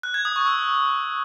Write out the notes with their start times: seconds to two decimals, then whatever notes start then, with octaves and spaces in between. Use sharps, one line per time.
0.03 F#6
0.14 G#6
0.25 D#6
0.36 C#6
0.47 E6